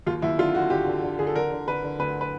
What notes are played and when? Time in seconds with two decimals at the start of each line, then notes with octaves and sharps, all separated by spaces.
0.07 D#2 F4
0.22 D#2 E4
0.38 D3 F4
0.55 D3 F#4
0.70 D3 G4
0.86 D3
1.03 D3
1.19 D3 G#4
1.27 A4
1.35 D3 A#4
1.52 D3
1.67 D3 B4
1.84 D3
1.99 D2 B4
2.21 B4